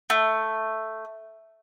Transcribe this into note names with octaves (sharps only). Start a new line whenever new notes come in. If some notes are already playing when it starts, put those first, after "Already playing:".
A3